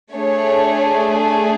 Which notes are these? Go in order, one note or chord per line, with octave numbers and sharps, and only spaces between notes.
A3 D4 G#4 C#5